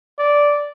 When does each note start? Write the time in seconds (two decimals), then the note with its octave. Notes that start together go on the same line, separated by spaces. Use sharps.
0.19 D5